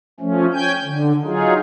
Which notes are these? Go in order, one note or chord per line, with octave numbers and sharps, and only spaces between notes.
F3 A3 C#4
C#4 G5 G#5 G6
D3
F#3 D#4 F4 G#4